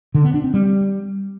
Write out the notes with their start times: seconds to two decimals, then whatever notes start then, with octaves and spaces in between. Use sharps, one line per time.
0.15 D3
0.24 B3
0.34 D4
0.44 C4
0.54 G3